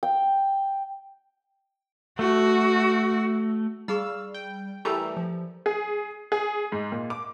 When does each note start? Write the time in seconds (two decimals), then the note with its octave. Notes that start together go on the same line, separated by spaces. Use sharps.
0.03 G5
2.19 A3 F#4
3.88 G3 D#4 G#4 F5 C#6 E6
4.34 G5
4.85 E3 G3 A3 G4 A4 A#4 A#5
5.17 F3
5.66 G#4
6.32 G#4
6.72 G#2
6.92 A#2
7.10 D6